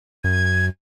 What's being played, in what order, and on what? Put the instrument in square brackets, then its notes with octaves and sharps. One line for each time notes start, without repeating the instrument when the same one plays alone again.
[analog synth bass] F#2 [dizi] G#6